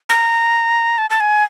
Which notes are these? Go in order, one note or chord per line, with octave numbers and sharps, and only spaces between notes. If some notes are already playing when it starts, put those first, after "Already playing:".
A#5
A5
A5
G#5